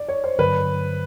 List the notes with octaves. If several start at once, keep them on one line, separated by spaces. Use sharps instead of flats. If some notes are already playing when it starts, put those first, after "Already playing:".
Already playing: D5
C#5
C5
G2 D3 F#3 B4